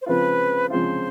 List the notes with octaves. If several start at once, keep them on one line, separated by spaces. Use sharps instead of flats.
C5
C#3 F3 G#3 C4 F4 B4
C#3 F3 G#3 C4 F4 C5